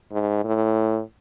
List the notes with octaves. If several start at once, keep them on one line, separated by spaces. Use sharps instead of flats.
G#2
A2